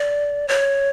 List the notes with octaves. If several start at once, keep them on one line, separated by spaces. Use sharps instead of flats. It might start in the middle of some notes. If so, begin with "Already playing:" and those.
Already playing: D5
C#5